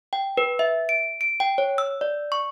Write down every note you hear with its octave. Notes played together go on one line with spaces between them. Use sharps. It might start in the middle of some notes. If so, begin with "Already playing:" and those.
G5
B4
E5
D7
D7
G5
C#5
E6
D5
C#6